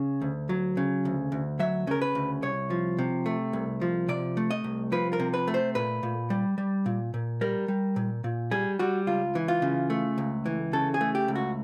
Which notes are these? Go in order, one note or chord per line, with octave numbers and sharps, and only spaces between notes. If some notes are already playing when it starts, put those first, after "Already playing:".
Already playing: C#3
D2
F#3
C#3
D2
D2
F#3 E5
C#3 A#4
B4
D2
C2 C#5
F3
C3
A3
C2
F3
C3 D5
A3
D#5
C2
F3 B4
A#4
C3
B4
A3
C5
A#2 B4
A#2
G3
G3
A#2
A#2
G3 A#4
G3
A#2
A#2
G3 G#4
G3 F#4
C#2 F4
E3
F4
C#3
A3
C#2
E3
C#3 A4
G#4
A3
G4
C#2
F#4